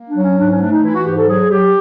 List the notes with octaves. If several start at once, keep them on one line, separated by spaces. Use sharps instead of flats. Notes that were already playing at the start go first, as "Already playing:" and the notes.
Already playing: A#3
D4
F#3
C#4
G#2 D4
C#4
A3 D4
D#4
E3 E4
F#4
G#2 G4
A4
F#3 G#4
F#3 G4